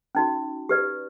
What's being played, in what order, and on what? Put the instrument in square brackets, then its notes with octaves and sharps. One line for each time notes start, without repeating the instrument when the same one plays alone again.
[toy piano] C#4 D#4 F#4
G4 B4 D5